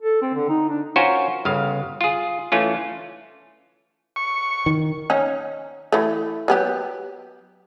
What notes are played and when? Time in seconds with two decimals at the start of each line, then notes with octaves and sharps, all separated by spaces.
0.02 A4
0.22 C4
0.34 D3
0.49 D#4
0.70 D4
0.96 C#4 F4 F#4 A#4 C5 C#5
1.45 G1 C#3 F5
2.01 F4 G#4
2.52 E3 A3 C#4 F4
4.16 C#6
4.66 D#3
5.10 C#4 D#4
5.92 E3 A3
6.48 F#3 B3 G4